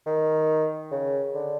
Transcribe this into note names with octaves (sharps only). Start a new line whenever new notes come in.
D#3
C#3
D3